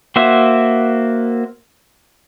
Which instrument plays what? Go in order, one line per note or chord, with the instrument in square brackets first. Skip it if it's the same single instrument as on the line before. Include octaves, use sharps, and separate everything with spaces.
[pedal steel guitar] A#3 F#4 C5 E5